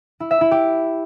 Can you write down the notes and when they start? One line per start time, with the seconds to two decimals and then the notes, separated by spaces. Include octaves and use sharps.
0.20 E4
0.31 E5
0.41 E4
0.51 G4